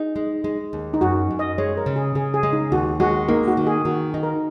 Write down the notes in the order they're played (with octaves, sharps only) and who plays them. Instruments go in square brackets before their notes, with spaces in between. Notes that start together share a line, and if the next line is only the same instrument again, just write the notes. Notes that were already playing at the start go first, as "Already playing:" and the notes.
Already playing: [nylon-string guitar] D#4 [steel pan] G#4
[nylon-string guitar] G#3
G#3
D#2
[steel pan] D#4
[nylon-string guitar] F#2 [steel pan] F#4
[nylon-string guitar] F#2
[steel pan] D#5
[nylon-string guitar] G#3 [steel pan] C#5
[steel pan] A#4
[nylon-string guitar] C#3
[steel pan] G#4
[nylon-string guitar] C#3 [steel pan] G#4
[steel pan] G#4
[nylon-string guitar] G#3
[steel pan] D#4
[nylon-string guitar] D#2 [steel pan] F#4
[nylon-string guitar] G#3 [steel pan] F#4
[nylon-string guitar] A#3 [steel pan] D#4
[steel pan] F#4
[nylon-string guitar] D#3
[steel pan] G#4
[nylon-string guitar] D#3 [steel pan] F#4
[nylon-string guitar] D#4
[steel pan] A#4